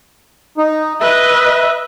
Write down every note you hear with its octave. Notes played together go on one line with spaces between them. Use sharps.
D#4
B4 D#5 E5